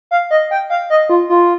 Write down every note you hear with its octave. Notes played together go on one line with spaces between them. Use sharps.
F5
D#5
G5
F5
D#5
F4
F4